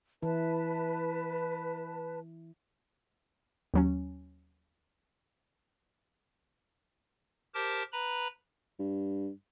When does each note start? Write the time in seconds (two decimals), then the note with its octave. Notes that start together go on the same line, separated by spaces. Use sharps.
0.23 E3 E4 B4 A5
3.74 D#2 F#3 C#4
7.54 G4 A#4 C5 A5 D6
7.93 B4 A#5 B5
8.79 G2